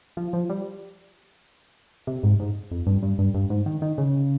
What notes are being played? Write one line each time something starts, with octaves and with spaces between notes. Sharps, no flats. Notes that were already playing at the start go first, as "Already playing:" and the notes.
F3
F3
G3
C3
G#2
G#2
F2
G2
G2
G2
G2
G#2
D#3
D#3
C#3